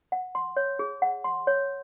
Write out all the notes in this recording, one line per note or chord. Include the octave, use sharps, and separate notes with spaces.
F#5
C6
C#5
G#4
F#5
C6
C#5